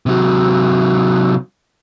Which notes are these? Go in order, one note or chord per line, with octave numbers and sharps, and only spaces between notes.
C3 F#3